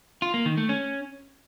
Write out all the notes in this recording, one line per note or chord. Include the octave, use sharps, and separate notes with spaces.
F4
A#3
D#3
A3
C#4